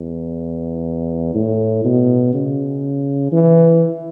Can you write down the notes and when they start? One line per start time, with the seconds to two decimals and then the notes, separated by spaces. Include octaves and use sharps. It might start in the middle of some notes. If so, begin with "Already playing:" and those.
Already playing: E2
1.35 A2
1.85 B2
2.34 C#3
3.32 E3